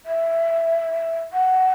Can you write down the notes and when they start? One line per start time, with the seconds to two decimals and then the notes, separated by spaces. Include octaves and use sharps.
0.06 E5
1.33 F#5